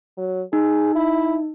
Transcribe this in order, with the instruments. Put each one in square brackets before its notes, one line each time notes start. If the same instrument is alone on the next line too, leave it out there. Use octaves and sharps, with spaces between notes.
[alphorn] F#3
[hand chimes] D#4 [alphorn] G#4
[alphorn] E4